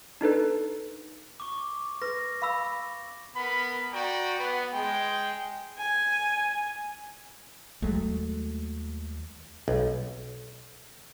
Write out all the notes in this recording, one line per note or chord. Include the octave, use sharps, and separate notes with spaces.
D4 D#4 A4 B4
C#6 D6
B4 A#6
F5 B5 E6
B3 A#4 B5
F#4 D5 G5 A#5
B3
G#3 G5
G#5
D#2 F#3 G#3 A3
B1